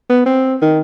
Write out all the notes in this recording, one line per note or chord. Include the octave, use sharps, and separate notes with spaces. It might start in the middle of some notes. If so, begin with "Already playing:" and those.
B3
C4
D#3